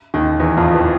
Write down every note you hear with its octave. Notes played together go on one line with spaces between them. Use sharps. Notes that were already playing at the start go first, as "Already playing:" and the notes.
D#2 D#3
E2 E3
F2 F3
E3